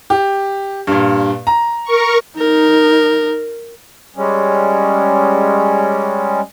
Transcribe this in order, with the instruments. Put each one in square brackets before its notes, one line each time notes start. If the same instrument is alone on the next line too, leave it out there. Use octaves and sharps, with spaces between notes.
[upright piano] G4
G2 A#2
A#5
[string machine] A#4 C#6
[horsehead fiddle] D#4 [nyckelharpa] A#4
[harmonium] G3 G#3 C#4